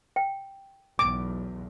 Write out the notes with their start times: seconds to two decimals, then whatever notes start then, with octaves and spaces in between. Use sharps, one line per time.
0.16 G5
0.99 B1 E2 D6